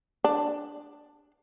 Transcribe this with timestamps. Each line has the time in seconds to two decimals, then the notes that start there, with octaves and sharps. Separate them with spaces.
0.24 D4